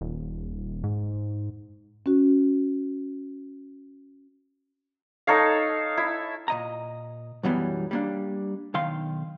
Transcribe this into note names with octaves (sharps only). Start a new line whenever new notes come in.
D#1
G#2
C#4 F#4
D#4 A4 C#5 F5
E4
A#2 D#5 A#5
B1 F#2 E3 F#3 G3 B3
G3 A#3 D4
B1 D#3 F5 C6